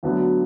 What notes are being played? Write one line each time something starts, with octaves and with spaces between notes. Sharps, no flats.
D2 D3 F#3 B3